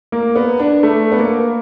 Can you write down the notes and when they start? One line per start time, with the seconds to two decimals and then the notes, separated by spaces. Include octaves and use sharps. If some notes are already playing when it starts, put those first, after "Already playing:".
0.12 A#3
0.36 B3
0.59 D4
0.83 A3
1.12 B3
1.19 A#3